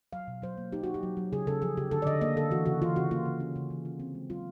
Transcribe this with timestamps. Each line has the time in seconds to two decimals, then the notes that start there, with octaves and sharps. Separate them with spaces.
0.13 F#3 F5
0.28 B2
0.42 F#3 C5
0.57 A#3
0.72 D#4 G4
0.83 D#4 F#4
0.94 G4
1.03 F#3
1.17 F#3
1.32 C#3 G#4
1.47 C#3 A4
1.62 F3 G#4
1.77 C#3 G4
1.91 D3 A4
2.02 D5
2.06 D3 D#5
2.21 A#3 D#5
2.37 D3 A4
2.51 E3 F#4
2.66 C#3 F#4
2.82 E3 F4
2.96 C#3 F#4
3.11 A#3 F4
3.25 C#3
3.40 C#4
3.56 C#3
3.70 E3
3.85 F4
4.00 C4
4.15 G#3
4.30 F#3 F4